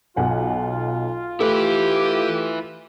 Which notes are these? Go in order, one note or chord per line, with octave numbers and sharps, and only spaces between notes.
B1 F4 F#5 G#5
A3 E4 G4 B4